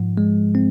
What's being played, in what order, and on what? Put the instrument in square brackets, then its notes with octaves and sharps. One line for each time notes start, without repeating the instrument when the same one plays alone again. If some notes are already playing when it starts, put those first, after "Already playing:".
Already playing: [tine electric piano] G#2 F3
G#3
C4